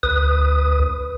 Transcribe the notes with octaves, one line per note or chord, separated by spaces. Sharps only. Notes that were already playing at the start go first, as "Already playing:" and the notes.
D2 B4 D#6